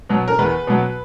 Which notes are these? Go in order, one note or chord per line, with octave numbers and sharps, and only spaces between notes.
B2 F#3
A#4
E2 B4
B2 F#3